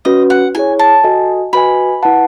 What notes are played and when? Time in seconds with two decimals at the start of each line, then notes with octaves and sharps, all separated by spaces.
0.05 C#4 F#4 B4 D#5
0.30 F#5
0.54 E4 G#4 C#5 G#5
0.79 A5
1.04 F#4 A4 D#5 G#5
1.53 F#4 B4 D#5 G#5 B5
2.03 E4 B4 F#5 A5